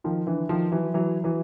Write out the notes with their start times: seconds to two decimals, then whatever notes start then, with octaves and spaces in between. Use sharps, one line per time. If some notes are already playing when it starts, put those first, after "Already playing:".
0.04 D#3 F3
0.27 D3 E3
0.49 D#3 F3
0.72 E3 F#3
0.94 E3 F#3
1.24 E3 F#3